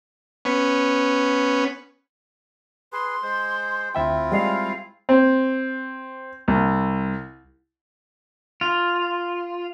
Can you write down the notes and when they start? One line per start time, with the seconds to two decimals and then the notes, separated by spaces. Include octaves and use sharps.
0.45 B3 C#4
2.92 G#4 B4 C6
3.23 G#3 C5
3.95 D2 C4 E4 F4 E5 G5
4.32 G3 G#3 F5
5.09 C4
6.48 C2
8.61 F4